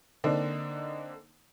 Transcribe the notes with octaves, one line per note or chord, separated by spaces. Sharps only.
D3 A#3 C4 D4 D#4